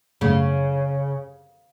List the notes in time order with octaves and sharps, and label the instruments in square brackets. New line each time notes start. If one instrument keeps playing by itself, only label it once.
[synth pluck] F#2 A3 [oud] C#3